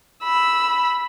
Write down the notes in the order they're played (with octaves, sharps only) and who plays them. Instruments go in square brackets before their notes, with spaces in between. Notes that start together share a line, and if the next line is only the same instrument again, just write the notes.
[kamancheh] B5 E6